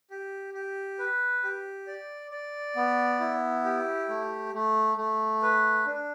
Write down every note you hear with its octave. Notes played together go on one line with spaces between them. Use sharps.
G4
G4
B4
G4
D5
D5
B3
E4
G4
A3
A3
A3
B4
D4